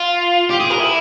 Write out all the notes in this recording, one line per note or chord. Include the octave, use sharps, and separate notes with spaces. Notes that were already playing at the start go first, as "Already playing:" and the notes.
Already playing: F4
G4
G#4
A#4
E4